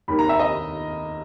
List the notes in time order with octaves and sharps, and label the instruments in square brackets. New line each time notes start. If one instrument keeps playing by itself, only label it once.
[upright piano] D#2 D#3 A#3 B5
A#5
E5
D#5